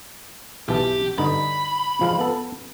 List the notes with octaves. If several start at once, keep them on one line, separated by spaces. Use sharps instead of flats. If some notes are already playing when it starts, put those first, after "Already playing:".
B1 E3 G4 A5
G2 D3 D#4 B5
F3 G#3 F5
B3 A4